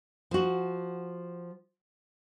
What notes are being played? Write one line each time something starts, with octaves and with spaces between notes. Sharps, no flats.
F3 F#4